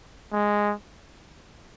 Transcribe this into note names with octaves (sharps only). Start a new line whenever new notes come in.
G#3